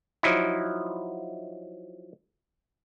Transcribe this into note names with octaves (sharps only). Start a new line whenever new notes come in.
F3 F#3 D#4 E4